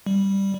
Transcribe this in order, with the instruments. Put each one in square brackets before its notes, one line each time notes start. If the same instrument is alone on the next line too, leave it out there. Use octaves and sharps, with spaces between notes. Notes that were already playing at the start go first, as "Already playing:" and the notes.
[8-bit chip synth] G3